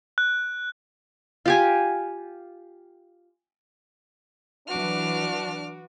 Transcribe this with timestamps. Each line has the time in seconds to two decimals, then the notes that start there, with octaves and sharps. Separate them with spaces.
0.18 F#6
1.46 F4 G4 G#5
4.68 E3 F#3 D4 F#4 B4 D6 F6